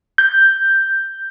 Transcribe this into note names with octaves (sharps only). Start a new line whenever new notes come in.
G6